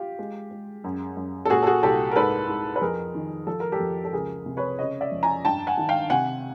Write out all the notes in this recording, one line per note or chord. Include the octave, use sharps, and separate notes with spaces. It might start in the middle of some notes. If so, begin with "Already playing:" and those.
Already playing: F4 G4
G#3
G#3
F#2
F#2
A4
A#2 F#4 G#4
A4
F#4 G#4
C2 G4 A4
A#4
G#2 A4 B4
G#2
B4
F2 G#4 A#4
D#3
F3 A4
A#4
G4 A4
F2
A4
C#2 G#4 A#4
C3
B4 C#5
C#3 C#5 D#5
D5 E5
F2
G#5 A#5
G2 G5 A5
F#5 G#5
D#3
F5 G5
C3 F#5 G#5